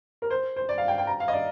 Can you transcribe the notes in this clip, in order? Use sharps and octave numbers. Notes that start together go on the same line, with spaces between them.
A#4
C5
C5
D5
F5
G5
G5
A#5
F5
D#5
D5